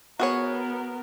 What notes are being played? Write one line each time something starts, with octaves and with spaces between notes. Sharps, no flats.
B3 F#4 G#4 A#4 C#5